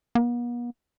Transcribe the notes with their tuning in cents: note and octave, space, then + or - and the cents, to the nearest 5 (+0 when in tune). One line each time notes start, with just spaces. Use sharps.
B3 -45